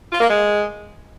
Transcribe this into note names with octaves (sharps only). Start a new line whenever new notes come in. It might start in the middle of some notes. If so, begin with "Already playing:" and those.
F4
A#3
G#3